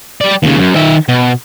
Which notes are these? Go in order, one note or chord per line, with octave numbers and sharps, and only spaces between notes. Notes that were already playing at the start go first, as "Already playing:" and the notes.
G3 D5
D#2 C#3
F#2
D#3 E5
B2